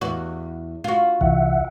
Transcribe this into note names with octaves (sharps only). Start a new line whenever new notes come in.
E2 F#4
F4 F#4
C2 E3 E5 F#5